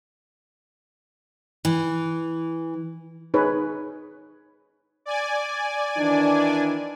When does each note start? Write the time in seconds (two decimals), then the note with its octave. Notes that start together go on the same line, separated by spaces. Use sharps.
1.65 E3
3.34 D#4 G#4 B4 C#5
5.06 D5 G#5
5.97 D#3 E3 D4